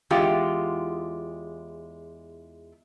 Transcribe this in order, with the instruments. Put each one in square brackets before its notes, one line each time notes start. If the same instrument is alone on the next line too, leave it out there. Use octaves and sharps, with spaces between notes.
[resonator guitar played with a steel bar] E2 G#3 F4 G4